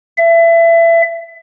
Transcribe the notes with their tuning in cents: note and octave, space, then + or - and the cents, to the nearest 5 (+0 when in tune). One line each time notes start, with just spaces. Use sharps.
E5 +25